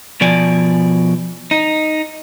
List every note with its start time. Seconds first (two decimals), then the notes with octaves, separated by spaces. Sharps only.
0.21 B2 F3 D5 G#5
1.51 D#4